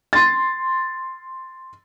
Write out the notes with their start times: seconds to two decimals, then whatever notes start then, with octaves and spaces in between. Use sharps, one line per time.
0.13 C6 A6